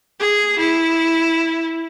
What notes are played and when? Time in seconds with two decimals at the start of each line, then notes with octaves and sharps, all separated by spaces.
0.20 G#4
0.59 E4